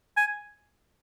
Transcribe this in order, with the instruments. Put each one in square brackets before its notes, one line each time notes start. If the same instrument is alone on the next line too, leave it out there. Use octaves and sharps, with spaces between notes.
[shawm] G#5